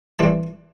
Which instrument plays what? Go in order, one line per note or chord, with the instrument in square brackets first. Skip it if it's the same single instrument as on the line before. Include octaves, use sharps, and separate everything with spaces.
[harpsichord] A2 E3 G3 C4 A5